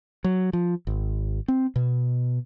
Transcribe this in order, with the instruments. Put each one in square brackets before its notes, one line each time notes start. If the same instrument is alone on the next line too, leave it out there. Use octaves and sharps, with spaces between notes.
[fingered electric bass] F#3
F3
G#1
C4
B2